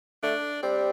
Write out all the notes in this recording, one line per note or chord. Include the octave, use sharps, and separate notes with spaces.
A3 D4
G3 C4